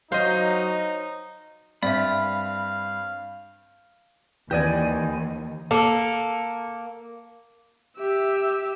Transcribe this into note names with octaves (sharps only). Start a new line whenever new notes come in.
F#3 D#4 C5 D#5 F5
G2 C4 D5 E5 F5 B5
D#2 E3 G4 B4 D5 D#5 G#5
A#3 A4
G4 E5